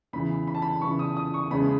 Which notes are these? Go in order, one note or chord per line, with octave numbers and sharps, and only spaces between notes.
E2 C#3 E3 B5
B5
A5
B5
E2 C#3 E3 C#6
D#6
D#6
C#6
E2 C#3 G#3 C#4 B5